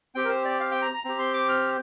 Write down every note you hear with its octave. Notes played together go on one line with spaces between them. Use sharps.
C4 G4 G5
A#4
C5
D5
F5
G5
A#5
A#5
C4 G4 A#5
C6
D6
F6